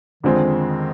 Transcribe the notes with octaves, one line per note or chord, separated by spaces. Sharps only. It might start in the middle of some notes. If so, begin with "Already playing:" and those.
F2 D3 D#3 F3 G#3 C4